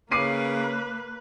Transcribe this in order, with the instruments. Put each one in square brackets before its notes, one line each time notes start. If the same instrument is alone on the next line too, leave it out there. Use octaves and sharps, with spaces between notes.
[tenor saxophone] C#3 [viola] A#3 [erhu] B4 [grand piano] D6 C7 D#7